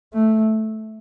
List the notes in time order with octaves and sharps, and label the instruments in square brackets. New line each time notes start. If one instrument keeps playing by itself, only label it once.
[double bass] A3